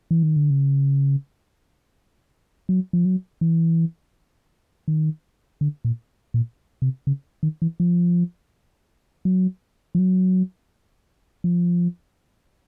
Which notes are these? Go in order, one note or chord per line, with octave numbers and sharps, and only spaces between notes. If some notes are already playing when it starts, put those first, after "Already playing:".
E3
D#3
D3
C#3
F#3
F3
F#3
E3
D#3
D3
A#2
A#2
C3
C#3
D#3
E3
F3
F#3
F3
F#3
F3